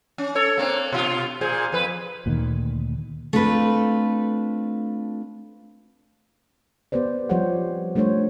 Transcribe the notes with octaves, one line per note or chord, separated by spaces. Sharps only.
C#4
A4 C#5
A#3 C4 D4
B2 F4
A#2 G#4 C5
F2 B4
D2 A#2 D#3
A3 C4 D4 F4 B4
B3 G4 B4 C5 D5
F3 G3 G4 C5 C#5 F#5
G3 A3 D4 C5 C#5